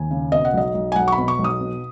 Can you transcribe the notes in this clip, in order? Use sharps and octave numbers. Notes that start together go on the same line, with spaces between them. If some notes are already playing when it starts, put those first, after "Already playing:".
Already playing: D#2 G#5
C#3
B2 D#5
F#5
B1 D#5
B1
G#5
B1 F#5
C#6
B5
B2
C#6
B1
D#6
B2